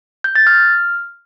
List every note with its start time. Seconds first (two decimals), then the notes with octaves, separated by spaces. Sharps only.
0.24 G6
0.35 A6
0.47 F6